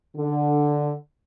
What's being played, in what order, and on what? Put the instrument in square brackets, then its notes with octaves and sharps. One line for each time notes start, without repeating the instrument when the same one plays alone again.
[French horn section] D3